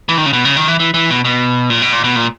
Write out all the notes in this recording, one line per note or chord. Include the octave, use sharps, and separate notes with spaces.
E3
D#3
C#3
B2
C#3
D#3
E3
E3
E3
B2
B2
A#2
B2
A#2
B2
A#2